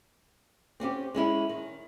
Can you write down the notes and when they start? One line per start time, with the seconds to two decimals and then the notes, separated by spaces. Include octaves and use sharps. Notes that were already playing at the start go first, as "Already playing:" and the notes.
0.80 C4 C#4 F4 G4
1.15 G#3 C#4 E4
1.49 D#3